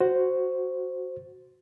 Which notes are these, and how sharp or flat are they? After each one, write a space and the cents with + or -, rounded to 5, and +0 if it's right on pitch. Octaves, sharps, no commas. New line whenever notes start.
F#4 +0 C5 -5